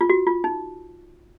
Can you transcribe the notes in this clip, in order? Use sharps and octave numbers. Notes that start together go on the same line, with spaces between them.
F4
F#4
F4
D#4